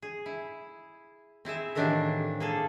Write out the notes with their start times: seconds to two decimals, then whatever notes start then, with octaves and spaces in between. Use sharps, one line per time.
0.02 G#4
0.26 E4
1.45 C4 E4 G#4 E5
1.75 A2 D#3 E3 D4 G4 F5
2.40 A#3 G#4 A4